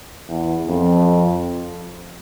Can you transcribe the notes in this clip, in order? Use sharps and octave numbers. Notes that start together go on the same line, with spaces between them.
E2
F2